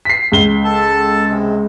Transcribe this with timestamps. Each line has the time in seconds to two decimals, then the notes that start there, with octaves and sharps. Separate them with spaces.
0.05 B6 C7
0.32 C#2 G7
0.65 A4 A5
1.26 C3 G#3